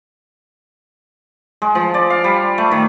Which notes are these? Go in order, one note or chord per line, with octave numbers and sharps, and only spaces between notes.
G#3
F3
D5
F5
G3
A3
D#3